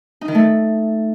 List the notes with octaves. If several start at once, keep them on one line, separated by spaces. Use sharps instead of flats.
D#4
D#3
A3